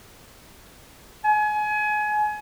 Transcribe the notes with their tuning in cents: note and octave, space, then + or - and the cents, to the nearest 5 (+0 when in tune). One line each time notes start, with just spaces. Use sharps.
G#5 +30